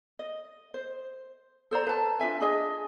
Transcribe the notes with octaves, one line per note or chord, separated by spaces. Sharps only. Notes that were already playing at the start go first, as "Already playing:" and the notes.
D#5
C5
A4 C5 D5 A#5
B4 A5
D4 F4 E5 G#5
D4 G#4 D#5 G#5